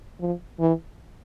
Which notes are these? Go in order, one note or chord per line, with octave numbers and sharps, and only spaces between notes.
F3
E3